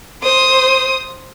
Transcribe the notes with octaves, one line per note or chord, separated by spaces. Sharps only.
C5 D#6